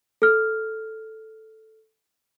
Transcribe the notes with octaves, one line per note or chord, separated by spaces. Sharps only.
A4 F6